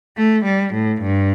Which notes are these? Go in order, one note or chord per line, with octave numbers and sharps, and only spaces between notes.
A3
G3
A2
G2